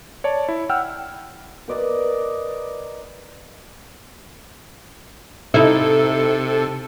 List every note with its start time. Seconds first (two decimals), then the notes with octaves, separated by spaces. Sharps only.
0.24 C#5 D5 A5
0.48 E4
0.69 F#5 G5 E6 F6
1.68 A#4 B4 D5 D#5
5.54 C3 D#4 E4 A4